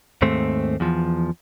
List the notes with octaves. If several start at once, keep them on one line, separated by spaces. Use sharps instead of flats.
D#2 G#2 A3 C4
E2 F3